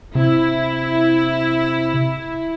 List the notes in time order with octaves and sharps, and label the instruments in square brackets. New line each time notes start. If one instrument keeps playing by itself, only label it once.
[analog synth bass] C3 [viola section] E4